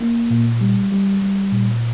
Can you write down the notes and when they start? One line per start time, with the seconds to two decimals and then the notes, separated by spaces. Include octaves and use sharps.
0.01 A#3
0.30 A#2
0.61 G3
0.92 G3
1.22 G3
1.52 A#2